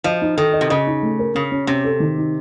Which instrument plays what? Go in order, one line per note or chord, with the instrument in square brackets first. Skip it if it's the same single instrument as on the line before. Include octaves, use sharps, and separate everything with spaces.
[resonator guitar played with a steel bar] F3 [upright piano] D#5
[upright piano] D#4
[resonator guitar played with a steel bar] D#3 [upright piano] A4
[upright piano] D#5
[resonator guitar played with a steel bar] C3
[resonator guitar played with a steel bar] C#3 [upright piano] D#5
[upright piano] D#4
A3
A#4
[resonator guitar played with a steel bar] C#3 [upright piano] C#4
[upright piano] C#4
[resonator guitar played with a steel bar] C3 [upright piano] C#4
[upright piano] A4
D#3
D#4